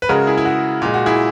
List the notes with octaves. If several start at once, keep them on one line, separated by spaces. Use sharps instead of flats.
B4
C#3 G#3 F#4 A#4
E4 G#4
E4
F#4
A#2 G#3
F#4
E4 G#4